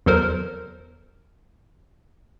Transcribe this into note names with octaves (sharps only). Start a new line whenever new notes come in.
E2 F#3 A4 A#4 C5